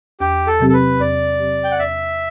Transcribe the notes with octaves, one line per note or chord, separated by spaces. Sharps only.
E2 G4
A4
C3 F#3 C4 G4
A4
B4
E2 D5
C3 F#3 C4 G4
G5
F#5
E2 E5